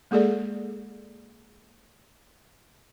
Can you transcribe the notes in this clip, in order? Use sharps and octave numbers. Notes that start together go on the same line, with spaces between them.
G#3 A#3 G#4 A4 D5